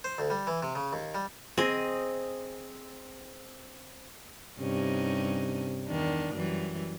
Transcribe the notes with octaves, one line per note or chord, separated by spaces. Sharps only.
C5
D2
G3
E3
C3
C#3
D#2
G3
C4 G#4 D#5
G2 C3 C#4 D#4
E2 D#3 D4
F#2 E3 G3